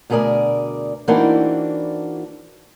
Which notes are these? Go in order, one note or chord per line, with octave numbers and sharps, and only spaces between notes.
D2 B2 G#4 A#4 D5
E3 A#3 C4 D4 D#4 F#4